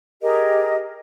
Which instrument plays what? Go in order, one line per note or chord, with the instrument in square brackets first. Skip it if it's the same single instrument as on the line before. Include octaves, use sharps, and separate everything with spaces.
[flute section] G4 G#4 A#4 D#5